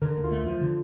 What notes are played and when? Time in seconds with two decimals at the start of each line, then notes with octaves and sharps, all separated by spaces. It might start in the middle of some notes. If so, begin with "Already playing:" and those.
0.02 D3 A#4
0.17 D2
0.24 F4
0.31 A3
0.46 F3 F4
0.61 D3